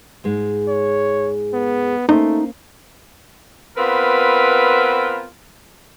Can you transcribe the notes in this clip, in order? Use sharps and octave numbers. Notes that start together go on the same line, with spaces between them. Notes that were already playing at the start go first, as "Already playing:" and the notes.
G#2 G#3
C#5
B3
A3 A#3 C#4 D#4 C5
B3 C4 F4 A#4 B4